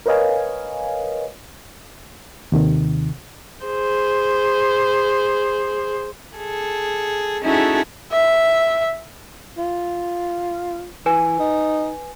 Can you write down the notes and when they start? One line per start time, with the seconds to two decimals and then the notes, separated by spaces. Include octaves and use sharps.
0.06 A#4 B4 C#5 D#5 F5 G#5
2.52 D#2 C3 D#3
3.65 G#4 C5
6.37 G#4 A4
7.41 C#4 D#4 E4 F#4 G#4 A4
8.12 E5
9.58 F4
11.06 E3 B4 G#5
11.39 D#4